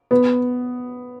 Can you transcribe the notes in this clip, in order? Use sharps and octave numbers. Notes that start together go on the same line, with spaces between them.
B3